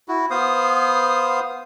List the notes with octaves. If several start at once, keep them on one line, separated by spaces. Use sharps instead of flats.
E4 F#4
B3 C5 F5 D#6